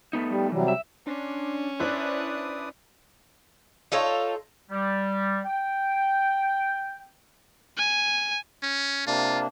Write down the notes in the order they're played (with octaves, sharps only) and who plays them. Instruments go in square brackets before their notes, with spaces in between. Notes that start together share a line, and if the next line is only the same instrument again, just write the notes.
[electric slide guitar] A3 B3 D#4
[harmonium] G3
[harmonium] C3 F#3 G3 [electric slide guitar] E3
[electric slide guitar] E5
[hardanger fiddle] C#4 [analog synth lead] D4 [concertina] C6
[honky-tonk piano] D4 E4 C5 [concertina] B4 D5 D#6 [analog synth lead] F#6
[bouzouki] D#4 F4 A4 C#5
[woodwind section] G3
G5
[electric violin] G#5
[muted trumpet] C#4
[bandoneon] C3 A#3 D4 [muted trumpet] F4